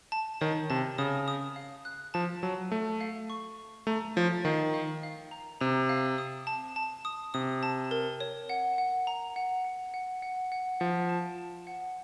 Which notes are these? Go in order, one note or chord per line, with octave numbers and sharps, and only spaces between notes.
A5
D#3 C#5
C3 A5
C#3 D#6
D#6
F5
F#6
F3 A5
F#3 A5
A3 C#6
F5
C#6
C#6
A3 A#5
F3 C#5
D#3 F5
F5
F5
A#5
C3 A#5
F5
D#6
A5
A5
D#6
C3 D#6
A5
A#4
C#5
F#5
F#5
A#5
F#5
F#5
F#5
F#5
F#5
F3 F#5
A5
A5
F#5